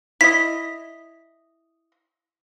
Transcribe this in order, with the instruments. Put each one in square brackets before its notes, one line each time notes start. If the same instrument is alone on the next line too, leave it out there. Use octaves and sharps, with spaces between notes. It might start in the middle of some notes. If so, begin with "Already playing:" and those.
[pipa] E4 D#5 [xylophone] B6